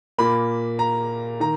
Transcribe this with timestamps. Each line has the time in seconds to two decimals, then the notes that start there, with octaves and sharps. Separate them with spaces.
0.18 A#2 A#3 B5
0.79 A#5
1.40 D#3 A#5